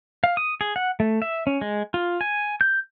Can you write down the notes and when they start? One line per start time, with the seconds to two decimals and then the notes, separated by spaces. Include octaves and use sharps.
0.24 F5
0.37 D#6
0.61 G#4
0.76 F#5
1.00 A3
1.22 E5
1.47 C#4
1.61 G#3
1.94 F4
2.21 G#5
2.61 G6